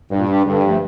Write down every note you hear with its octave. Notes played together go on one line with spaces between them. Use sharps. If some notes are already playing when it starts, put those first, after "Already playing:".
G2 A#2
G3 D4 G4
G2 D3
F3 A3